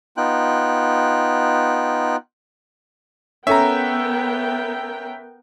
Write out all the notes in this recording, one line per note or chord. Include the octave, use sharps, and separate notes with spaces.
B3 D#4 F4 G5 F#6
B3 C#4 A4 A#4 E5 G5 A#5